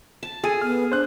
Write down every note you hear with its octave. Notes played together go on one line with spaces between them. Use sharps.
A5
G#4 A4 D#7
B3 F6
D4 C5 F#6